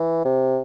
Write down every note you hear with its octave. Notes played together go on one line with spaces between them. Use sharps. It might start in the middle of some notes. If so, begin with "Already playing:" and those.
Already playing: E3
C3